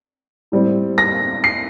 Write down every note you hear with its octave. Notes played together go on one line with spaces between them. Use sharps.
A2 G3 C4
A#6
C7